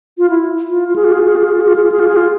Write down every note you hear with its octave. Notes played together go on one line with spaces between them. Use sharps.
F4
E4
F4
F4
G#4
F4
G#4
F4
G#4
F4
G#4
F4
G#4
F4
G#4
F4
G#4
F4
G#4
F4